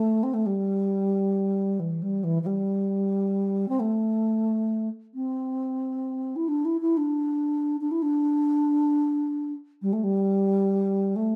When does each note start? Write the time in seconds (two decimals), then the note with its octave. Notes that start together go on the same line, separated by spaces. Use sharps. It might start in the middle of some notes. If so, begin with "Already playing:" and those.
Already playing: A3
0.23 C4
0.34 A3
0.46 G3
1.79 E3
2.02 G3
2.24 E3
2.42 E3
2.46 G3
3.68 C4
3.80 A3
5.14 C4
6.36 E4
6.48 D4
6.65 E4
6.81 E4
6.97 D4
7.81 D4
7.91 E4
8.02 D4
9.82 G3
9.93 A3
10.03 G3
11.16 A3